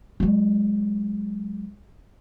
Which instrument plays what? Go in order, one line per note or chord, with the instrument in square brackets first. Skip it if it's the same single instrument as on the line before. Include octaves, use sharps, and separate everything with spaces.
[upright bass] F#3 G#3